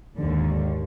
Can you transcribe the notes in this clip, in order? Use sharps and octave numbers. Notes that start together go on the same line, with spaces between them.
D#2 G#2 D3